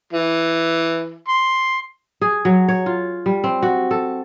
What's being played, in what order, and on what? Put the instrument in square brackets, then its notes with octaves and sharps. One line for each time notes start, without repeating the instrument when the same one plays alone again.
[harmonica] E3
C6
[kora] G#4
F#3
C#5
F4
G3
C4
F#4
A4